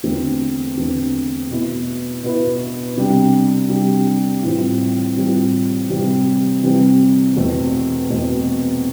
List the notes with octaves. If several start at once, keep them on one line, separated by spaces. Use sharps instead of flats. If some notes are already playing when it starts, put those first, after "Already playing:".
E2 D3 A3 C4
E2 D3 A3 C4
B2 B3 E4
B2 B3 E4
C3 G3 D4 G4
C3 G3 D4 G4
A2 E3 G3 C4 F4
A2 E3 G3 C4 F4
C3 E3 G3 C4
C3 E3 G3 C4
E2 B2 A3 C4
E2 B2 A3 C4